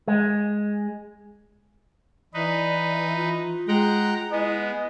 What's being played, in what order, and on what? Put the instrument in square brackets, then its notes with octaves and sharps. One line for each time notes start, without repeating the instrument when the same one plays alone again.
[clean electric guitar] G#3
[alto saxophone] E3 [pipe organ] D#4 B4 [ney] D5
[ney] F4
[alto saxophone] G#3 [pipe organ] F#5 G5 A#5
[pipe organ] G#3 B3 [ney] E4 [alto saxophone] D#5